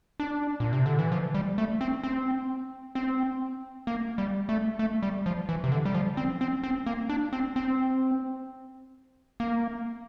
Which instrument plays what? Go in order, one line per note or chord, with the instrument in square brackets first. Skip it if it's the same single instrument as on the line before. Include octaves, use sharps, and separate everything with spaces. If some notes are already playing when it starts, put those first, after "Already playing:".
[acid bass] D4
A#2
C3
D3
E3
F3
G3
A3
C4
C4
C4
A#3
G3
A3
A3
G3
F3
E3
C3
D3
G3
F3
C4
C4
C4
A#3
D4
C4
C4
A#3